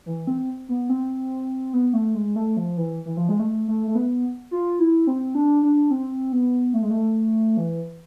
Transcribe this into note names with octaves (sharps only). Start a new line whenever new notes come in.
E3
C4
B3
C4
B3
A3
G#3
A3
F3
E3
E3
F3
G#3
A3
A3
A3
B3
F4
E4
C4
D4
D4
C4
B3
A3
G#3
A3
E3